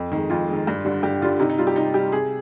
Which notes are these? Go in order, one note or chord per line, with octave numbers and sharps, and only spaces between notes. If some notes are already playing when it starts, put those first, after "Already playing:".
Already playing: F2
D#3 G#3
F2 F4
D#3 G#3
G2
D3 G3
G2 G4
D3 G3 F4
C3 D#4
D#4
G3 F4
G4
C3 D#4
G3 G4
C3 G#4